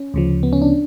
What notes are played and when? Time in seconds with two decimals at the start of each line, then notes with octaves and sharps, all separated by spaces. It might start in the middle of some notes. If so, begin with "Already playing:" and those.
Already playing: C#4
0.14 D2 C#3 F3
0.43 B3
0.53 C#4
0.62 D4